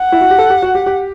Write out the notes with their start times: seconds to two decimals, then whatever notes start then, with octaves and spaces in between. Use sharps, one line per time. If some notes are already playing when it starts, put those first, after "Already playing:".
Already playing: F#5
0.12 E4
0.21 F#4
0.30 G4
0.38 A4
0.50 G4
0.62 F#4
0.75 G4
0.86 G4